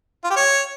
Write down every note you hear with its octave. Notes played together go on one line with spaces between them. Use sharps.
F4
G4
C#5